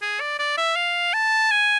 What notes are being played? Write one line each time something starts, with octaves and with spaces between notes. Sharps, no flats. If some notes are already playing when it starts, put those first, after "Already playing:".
G#4
D5
D5
E5
F5
A5
G#5